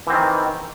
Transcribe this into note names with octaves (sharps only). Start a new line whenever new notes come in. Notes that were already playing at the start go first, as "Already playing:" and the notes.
D#3 E3 C4